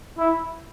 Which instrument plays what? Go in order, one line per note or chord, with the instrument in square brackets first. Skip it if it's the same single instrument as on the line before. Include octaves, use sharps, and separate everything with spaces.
[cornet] E4